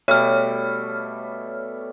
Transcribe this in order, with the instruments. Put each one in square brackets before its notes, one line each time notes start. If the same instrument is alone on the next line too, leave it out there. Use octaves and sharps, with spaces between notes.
[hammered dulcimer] B2 G3 A3 [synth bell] C#5 F6